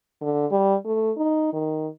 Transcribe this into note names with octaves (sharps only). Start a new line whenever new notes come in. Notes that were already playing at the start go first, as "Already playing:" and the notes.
D3
G3
A3
D#4
D#3